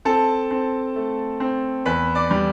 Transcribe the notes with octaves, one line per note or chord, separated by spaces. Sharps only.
C4 A4 A5
C4
A3
C4
E2 B4 B5
D5 D6
G3